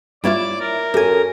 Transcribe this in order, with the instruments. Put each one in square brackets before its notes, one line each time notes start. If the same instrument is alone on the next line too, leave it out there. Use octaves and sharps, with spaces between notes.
[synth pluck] G3 A#3 F4 [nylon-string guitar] E4 C#5 E5 [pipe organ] D5 D6
[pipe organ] A#4
[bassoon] F#2 [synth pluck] G4 G#6 [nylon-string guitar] A4 G#5